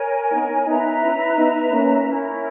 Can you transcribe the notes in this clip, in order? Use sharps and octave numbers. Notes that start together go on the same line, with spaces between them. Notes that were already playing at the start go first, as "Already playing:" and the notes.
Already playing: A#4 C#5 G#5
B3 D#4
B3 D#4 B4 E5 A#5
C#4 E4
B3 D#4
A#3 C#4
C#4 E4 A#4